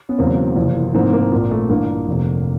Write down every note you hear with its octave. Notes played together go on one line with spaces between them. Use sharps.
B3 C#4
E1 E2 C#3 F#3 A#3 C4
F#1 E2 C3 F3
A1 G#2 F3 A#3 C4
A#3
A#1 A#2 F3 A#3
A3
A1 G2 D3 A#3
F1 F2 C3